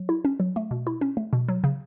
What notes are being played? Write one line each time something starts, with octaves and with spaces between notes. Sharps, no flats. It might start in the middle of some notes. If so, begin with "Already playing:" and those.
Already playing: F#3
E4
C#4
F#3
A3
B2
E4
C#4
A3
B2
F#3
C#3